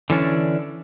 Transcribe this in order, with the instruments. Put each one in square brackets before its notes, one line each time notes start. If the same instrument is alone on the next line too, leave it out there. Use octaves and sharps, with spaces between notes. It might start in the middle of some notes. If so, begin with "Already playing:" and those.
[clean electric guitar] D3 E3 C#4 D4